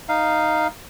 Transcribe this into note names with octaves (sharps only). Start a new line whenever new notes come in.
D#4 F5